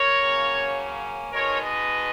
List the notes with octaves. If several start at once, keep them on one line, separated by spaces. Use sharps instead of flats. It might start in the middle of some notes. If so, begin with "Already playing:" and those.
Already playing: A#4 C#5
C#3 F#3 A#3 C#4
B2 G#3 D#4 A#4 C#5
B4 D#5